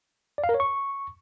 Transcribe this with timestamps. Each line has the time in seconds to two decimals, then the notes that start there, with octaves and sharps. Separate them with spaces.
0.38 D5
0.44 F5
0.49 A#4
0.54 C#5
0.60 C#6